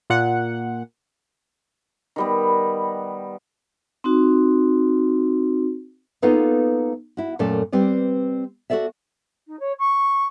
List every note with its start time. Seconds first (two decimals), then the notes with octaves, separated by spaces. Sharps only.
0.10 A#2 F#5
2.16 D#3 G3 B3
4.04 C4 D#4 F#4
6.22 A#3 B3 D#4 F4 A4 B4
7.17 E4 F#4
7.39 F#2 A#2 A3 C#4 A4 D5
7.72 G3 C4 B4 D5
8.70 F#4 G#4 A4 D5 E5
9.47 D#4
9.60 C#5
9.79 C#6